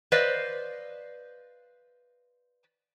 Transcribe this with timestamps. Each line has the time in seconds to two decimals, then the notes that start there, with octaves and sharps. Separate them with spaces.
0.12 B4 C5 D5 D#5 F5